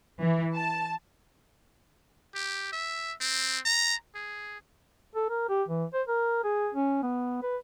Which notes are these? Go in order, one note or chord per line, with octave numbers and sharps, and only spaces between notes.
E3
A5
G4
E5
C4
A#5
G#4
A4
A#4
G4
E3
C5
A#4
G#4
C#4
B3
B4